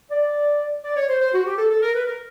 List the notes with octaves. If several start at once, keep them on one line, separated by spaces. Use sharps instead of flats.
D5
D5
C#5
C5
C5
F#4
G4
A4
A4
A#4
B4
A#4